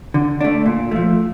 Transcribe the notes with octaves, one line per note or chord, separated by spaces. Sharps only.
D3
A3 D4
A#2
F3 A3